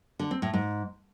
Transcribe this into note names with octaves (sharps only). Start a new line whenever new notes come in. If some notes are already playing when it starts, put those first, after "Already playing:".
D3
C4
A2
G#2